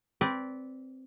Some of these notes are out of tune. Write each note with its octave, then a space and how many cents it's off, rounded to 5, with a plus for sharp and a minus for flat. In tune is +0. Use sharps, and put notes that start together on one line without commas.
C4 +0 B4 -10 D5 -20